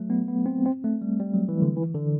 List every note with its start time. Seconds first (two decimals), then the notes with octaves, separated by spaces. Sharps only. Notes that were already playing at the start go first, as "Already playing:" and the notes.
Already playing: F#3 A3
0.10 B3
0.28 B3
0.46 C4
0.65 C4
0.84 A3
1.02 G3
1.20 G3
1.34 F#3
1.49 E3
1.62 D3
1.76 E3
1.95 D3